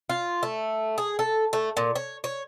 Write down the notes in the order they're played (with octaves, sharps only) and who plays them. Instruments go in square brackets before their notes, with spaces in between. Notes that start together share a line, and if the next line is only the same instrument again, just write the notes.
[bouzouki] F4
A3
G#4
A4
A3
A#2
C#5
C#5